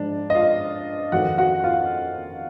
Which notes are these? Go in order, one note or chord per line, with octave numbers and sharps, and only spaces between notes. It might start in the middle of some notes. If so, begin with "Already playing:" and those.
Already playing: G#2 F3 D4
D#5
F4 F5
F2 D#3 F#4 F#5
F#4 F#5
F4 F5